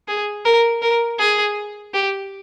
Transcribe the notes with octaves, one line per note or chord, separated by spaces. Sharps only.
G#4
A#4
A#4
G#4
G4